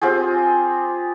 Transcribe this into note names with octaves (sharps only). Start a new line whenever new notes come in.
C4 F4 G4 G#4